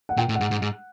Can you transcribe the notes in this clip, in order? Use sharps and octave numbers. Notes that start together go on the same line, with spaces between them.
F#5
A#2 G5
A2
F#5
G#2
G#2
G#2